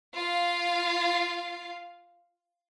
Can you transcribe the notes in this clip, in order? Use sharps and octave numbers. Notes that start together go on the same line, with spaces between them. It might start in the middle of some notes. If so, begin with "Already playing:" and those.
F4 F5